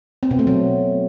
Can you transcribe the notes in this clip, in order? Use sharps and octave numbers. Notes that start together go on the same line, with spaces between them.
C4
B2
A3
F#3